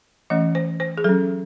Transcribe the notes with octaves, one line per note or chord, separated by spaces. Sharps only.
E3 A3 C#4 D#5
C5
C5
G#4
F#3 C#4 A4